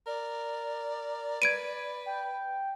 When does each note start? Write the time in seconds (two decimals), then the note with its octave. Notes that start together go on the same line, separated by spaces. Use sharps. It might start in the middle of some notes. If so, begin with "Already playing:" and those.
0.07 A#4 D5
1.42 B4 G#6 D7 D#7
2.06 G5